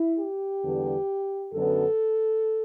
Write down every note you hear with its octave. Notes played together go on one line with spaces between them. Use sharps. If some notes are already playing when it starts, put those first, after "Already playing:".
Already playing: E4
G4
E2 D3 G3 B3
F#2 D3 F#3 B3 A4